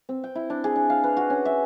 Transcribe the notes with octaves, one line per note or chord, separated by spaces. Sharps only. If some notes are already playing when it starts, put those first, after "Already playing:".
C4
G5
E4
D4
G#4
D4
F5
B4
F#4
C#4
E5